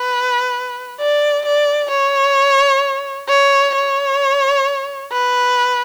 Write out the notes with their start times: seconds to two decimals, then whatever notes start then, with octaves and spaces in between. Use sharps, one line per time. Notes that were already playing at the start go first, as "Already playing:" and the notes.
Already playing: B4
1.00 D5
1.46 D5
1.91 C#5
3.29 C#5
3.75 C#5
5.12 B4